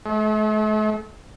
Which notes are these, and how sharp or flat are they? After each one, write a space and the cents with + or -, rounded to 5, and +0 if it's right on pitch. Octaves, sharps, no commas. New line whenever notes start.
A3 -45